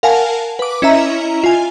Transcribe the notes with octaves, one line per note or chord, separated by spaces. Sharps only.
A#4 F5 F#5 G#5 A5
B4 D6
C#4 E4 D#5 E5 A#5
F4 G#5